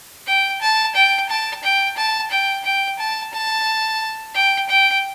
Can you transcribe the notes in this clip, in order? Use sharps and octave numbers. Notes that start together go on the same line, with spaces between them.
G5
A5
G5
A5
G5
A5
G5
G5
A5
A5
G5
G5